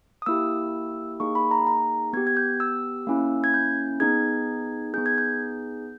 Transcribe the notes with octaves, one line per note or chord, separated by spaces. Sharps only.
D#6
A#3 E4 G4 E6
A#3 D#4 G#4 C#6
B5
A#5
A#5
B3 G4 G#6
G#6
G6
E6
A#3 C#4 E4
G#6
G6
B3 D#4 G#4 G#6
B3 D#4 G#4 G6
G#6
G6